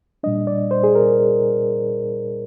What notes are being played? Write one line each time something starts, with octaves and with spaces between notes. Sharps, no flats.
A#2 G3 D4 D#5
D5
C5
G#4
A#4